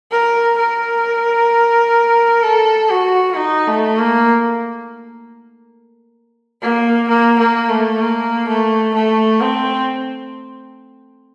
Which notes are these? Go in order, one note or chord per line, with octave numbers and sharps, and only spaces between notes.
A#4
A#4
A4
F#4
D#4
A3
A#3
A#3
A#3
A#3
A3
A#3
A3
A3
C4